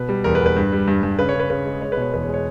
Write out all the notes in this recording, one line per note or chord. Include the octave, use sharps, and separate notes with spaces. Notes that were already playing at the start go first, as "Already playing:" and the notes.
Already playing: B2 B4
G3
E2 A#4
B4
E2
B4
G2
G3
G2
G2
C#3 B4
C#5
C#3
B4
C#3 B4
G#3
G#3 C#5
B4
B2 C#5
E2 B4
C#5
G#3
C#5